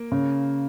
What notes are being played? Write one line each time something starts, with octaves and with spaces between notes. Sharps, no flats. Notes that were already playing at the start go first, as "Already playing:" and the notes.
Already playing: A#3
C#3